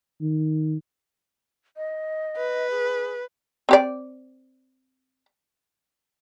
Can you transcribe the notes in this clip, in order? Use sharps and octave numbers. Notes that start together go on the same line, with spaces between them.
D#3
D#5
B4
G#4
C4 G4 D5